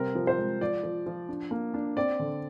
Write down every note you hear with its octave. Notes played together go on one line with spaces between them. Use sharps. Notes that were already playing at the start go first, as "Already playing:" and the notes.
Already playing: C3 G3 C4 A#4
F3
C5
G#3
F3 D5
F3
F3
D4
A#3
D4
C4 D5
D3